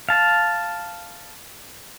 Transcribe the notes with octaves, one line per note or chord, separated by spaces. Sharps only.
F5 A5